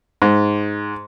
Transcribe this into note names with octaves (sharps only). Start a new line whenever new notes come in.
G#2